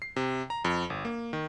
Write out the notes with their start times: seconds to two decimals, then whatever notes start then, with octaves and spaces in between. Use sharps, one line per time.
0.02 C7
0.16 C3
0.50 A#5
0.65 F2
0.90 G1
1.05 A#3
1.33 D#3